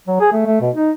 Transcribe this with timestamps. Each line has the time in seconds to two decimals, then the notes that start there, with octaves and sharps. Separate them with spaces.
0.08 F#3
0.20 G#4
0.33 A3
0.46 A3
0.61 B2
0.75 D#4